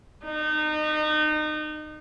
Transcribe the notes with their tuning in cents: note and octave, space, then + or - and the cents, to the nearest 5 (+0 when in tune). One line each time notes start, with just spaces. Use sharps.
D#4 -30